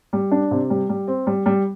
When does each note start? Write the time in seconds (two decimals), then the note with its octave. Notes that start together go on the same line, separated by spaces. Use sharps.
0.13 G3
0.31 D4
0.51 C3
0.70 G3
0.89 G3
1.08 C4
1.27 G3
1.46 G3